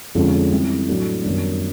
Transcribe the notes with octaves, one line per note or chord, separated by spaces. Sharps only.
F2 D3 F3 G#3 C#4
E3 G3 C4 E4
A2 F#3 A3 D4
F#2 D#3 G3 B3 D4